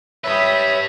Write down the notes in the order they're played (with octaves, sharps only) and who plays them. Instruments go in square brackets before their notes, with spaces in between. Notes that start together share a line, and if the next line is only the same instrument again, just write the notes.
[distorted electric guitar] G4 B4 [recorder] C#5 [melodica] E5 [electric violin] B5 D#6